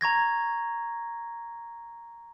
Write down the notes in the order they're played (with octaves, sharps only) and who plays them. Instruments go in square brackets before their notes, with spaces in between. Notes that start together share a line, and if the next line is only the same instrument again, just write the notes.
[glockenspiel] A#5 C#6 G#6 A#6